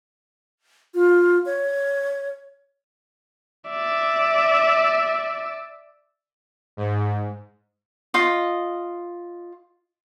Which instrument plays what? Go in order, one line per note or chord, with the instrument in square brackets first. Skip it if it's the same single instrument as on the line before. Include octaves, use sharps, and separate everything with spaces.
[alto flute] F4
C#5
[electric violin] D5 E5
[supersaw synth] G#2
[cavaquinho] F4 D#5